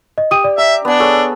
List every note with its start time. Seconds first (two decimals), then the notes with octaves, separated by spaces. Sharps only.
0.18 D#5
0.31 G4 D#6 D#7
0.44 D5
0.58 E5 A#5
0.85 B3 D4 G#5
1.00 G#4 A4 C#5